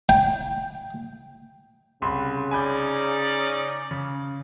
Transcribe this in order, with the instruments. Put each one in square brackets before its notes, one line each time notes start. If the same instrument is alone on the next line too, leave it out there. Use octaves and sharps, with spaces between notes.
[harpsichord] G5
[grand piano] C2 B5 C6 [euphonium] C#3
[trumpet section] C#4 D#4 D5 [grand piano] G#5 B5 G6
[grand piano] C#3